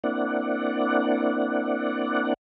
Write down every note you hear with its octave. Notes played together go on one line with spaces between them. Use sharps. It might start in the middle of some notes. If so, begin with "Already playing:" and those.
A#3 C4 D4 E4 D5 F#5